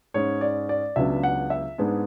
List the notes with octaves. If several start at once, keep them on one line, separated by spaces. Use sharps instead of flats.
G#2 G#3 C#4 C#5
D5
D5
C#2 C#3 F#3 B3 D4 E5
F#5
E5
G#2 G#3 B3 D4